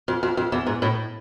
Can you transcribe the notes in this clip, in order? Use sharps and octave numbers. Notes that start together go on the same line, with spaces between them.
F2
F2
F2
E2
G#2
A2